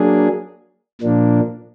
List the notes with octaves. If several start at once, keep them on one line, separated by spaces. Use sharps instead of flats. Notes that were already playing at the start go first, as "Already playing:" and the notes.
Already playing: F#3 A#3 D4 G#4
A#2 F3 A#3 D4